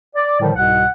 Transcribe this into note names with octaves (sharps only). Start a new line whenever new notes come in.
D5
A2 D3 D#3 F3 G3
C2 G#2 B2 F#5